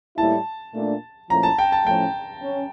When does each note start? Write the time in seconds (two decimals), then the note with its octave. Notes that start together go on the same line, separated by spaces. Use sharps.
0.17 A2 G3 A#3 E4 A5
0.74 A#2 A3 D4
1.29 A#2 F3 A3 C#4 E4 A#5
1.43 A5
1.58 G5
1.72 A5
1.86 A2 F3 A3 C#4 G5
2.42 C#4